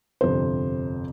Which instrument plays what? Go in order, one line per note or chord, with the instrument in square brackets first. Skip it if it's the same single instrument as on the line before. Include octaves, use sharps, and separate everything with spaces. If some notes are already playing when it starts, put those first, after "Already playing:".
[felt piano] G1 F2 C3 C5